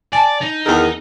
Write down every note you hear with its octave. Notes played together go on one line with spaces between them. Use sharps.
D5 G#5 A5
D#4
E2 D#3 G#4 A#4